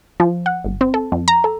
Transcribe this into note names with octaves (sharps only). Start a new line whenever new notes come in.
F3
F#5
G1
C4
A4
F2
A#5
A4